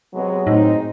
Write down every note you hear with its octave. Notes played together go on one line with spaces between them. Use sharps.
C3 F#3 G#3 B3
A2 G#3 C4 D#4